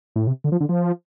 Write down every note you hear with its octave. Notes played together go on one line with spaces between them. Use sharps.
A2
C3
D3
F3
D3
F3